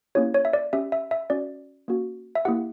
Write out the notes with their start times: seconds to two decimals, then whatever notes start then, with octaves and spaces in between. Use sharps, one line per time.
0.15 A#3 C#4 E4 G4 C#5
0.34 C#5
0.45 E5
0.53 D5
0.73 C#4 G4 E5
0.92 E5
1.11 E5
1.30 C#4 F#4 D5
1.88 A#3 C#4 F#4
2.35 E5
2.45 A#3 E4 G4 F#5